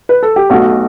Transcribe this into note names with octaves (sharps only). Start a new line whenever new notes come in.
B4
A4
G4
B1 B2 A3 F#4